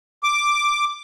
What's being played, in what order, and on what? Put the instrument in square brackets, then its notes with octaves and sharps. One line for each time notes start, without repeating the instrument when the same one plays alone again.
[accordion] D6